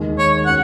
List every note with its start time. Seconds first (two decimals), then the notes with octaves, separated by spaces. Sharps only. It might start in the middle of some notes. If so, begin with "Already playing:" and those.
Already playing: D#2 D#3 G#3
0.18 C#5
0.46 C#4 F#4 C#5 F#5